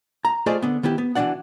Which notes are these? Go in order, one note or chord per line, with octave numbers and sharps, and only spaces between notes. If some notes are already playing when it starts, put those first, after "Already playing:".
A#5
A3 F4 G#4 C5 D5 D#5
D3 B3
D#3 B3 E4 G4
B3
B2 E3 C4 D4 D5 F#5